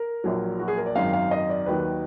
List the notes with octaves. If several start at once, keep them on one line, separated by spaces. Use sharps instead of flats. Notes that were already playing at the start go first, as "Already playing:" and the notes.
Already playing: A#4
A#1 A#2 F#3
F#4
G#4
A#4
D5
G#1 F#2 D#3 F5
F5
D#5
D5
D#2 D#3 F#3 B4